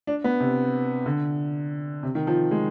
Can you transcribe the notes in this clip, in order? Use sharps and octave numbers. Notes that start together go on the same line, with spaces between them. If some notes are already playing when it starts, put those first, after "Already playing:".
D4
B3
C3
D3
C3
D#3
F3
G#3